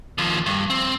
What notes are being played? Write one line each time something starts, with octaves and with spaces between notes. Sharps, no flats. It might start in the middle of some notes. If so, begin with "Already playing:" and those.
D#2 F3
G2
C4